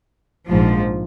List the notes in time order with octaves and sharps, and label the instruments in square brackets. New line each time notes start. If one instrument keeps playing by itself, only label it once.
[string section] A#1 G#2 F3